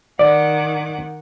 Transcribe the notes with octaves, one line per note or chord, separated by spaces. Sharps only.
D#3 D5 F#5 D6